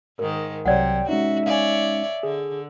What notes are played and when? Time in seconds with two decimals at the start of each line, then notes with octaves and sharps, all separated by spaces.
0.19 G#2 D#3 A#4
0.66 C2 C3 F#3 C#5 D5 F#5 G5 G#6
1.09 G#3 C#4 D#4 F#4 E5
1.46 C#5 D5 F5 G#5
2.23 D3 G#4